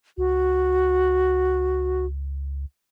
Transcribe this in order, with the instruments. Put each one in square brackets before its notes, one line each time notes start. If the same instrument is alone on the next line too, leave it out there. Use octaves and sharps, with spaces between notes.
[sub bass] C#2 [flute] F#4